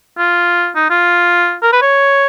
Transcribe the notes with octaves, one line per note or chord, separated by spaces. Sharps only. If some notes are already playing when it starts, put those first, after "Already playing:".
F4
D#4
F4
A#4
B4
C#5